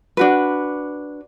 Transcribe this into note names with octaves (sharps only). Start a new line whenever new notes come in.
D4 F#4 B4